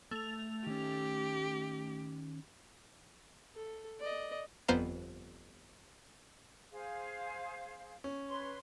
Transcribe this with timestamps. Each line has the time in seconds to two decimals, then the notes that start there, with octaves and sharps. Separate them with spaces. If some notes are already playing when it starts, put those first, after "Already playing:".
0.11 A3 F7
0.67 D#3 C#4 G4
3.55 A4
4.00 D5 D#5
4.68 G1 F2 B3 C5 F5 A#5
6.72 G#4 C5 F5
8.04 C#4
8.29 B4 C#5 C6